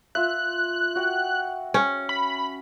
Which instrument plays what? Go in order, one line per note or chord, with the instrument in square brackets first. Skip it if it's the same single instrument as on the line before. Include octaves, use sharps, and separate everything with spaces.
[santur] F4 E5 [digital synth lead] F#6
[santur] F#4 F#5 G5
[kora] C#4
[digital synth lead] B5